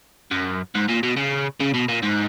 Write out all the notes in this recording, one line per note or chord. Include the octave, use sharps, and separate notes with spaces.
F#2
G#2
A#2
B2
C#3
C#3
B2
A#2
G#2